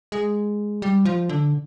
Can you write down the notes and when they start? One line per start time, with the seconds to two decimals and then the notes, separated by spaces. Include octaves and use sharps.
0.12 G#3
0.82 G3
1.05 F3
1.29 D3